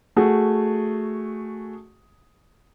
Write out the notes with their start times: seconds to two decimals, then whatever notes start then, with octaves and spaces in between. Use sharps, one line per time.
0.16 A3 F#4 G#4